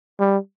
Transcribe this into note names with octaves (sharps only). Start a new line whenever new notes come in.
G3